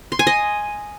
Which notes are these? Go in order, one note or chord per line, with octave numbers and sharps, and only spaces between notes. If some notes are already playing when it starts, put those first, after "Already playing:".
C6
G#5
D#5